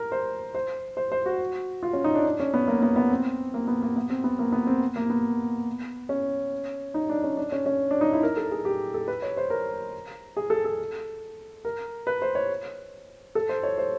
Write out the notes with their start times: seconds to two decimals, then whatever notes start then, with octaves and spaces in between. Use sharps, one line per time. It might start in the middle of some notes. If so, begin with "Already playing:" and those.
Already playing: A#4
0.12 C5
0.54 C5
0.97 C5
1.12 C5
1.26 F#4
1.83 F4
1.93 C#4
2.04 D#4
2.15 D4
2.25 D4
2.40 C#4
2.54 B3
2.68 A#3
2.83 B3
2.96 B3
3.11 C4
3.54 A#3
3.68 B3
3.82 A#3
3.96 B3
4.10 C4
4.24 B3
4.39 A#3
4.52 B3
4.67 C4
4.96 A#3
5.10 B3
6.09 C#4
6.94 D#4
7.10 D4
7.24 C#4
7.37 D4
7.52 C#4
7.66 C#4
7.91 D4
8.01 D#4
8.13 E4
8.23 A#4
8.37 A4
8.51 G#4
8.65 G4
8.94 A4
9.08 B4
9.22 C#5
9.37 C5
9.50 A#4
10.37 G#4
10.50 A4
10.65 A4
11.65 A#4
12.07 B4
12.22 C5
12.35 C#5
13.35 A4
13.49 C5
13.63 C#5
13.78 C5